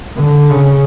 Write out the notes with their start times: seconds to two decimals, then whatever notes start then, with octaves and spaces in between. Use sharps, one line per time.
0.18 D3
0.51 C#3